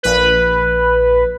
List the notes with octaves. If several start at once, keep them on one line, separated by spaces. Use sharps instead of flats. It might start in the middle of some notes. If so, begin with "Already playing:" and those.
A#1 B4